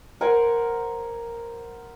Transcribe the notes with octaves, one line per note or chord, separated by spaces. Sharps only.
A#4 C5 F#5 G#5